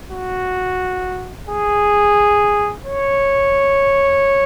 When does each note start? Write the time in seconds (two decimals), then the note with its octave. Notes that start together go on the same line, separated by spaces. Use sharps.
0.11 F#4
1.49 G#4
2.86 C#5